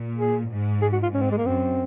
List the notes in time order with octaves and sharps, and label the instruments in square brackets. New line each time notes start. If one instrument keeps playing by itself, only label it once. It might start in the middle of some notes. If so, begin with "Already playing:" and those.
Already playing: [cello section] A#2
[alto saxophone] G#4
[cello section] G#2
[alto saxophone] G#4
F#4
F4
[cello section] G#2 [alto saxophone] C#4
[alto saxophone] C4
G#3
A#3
[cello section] F#2 [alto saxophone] C4